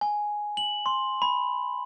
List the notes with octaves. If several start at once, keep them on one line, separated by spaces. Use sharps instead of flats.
G#5
F#7
C6
B5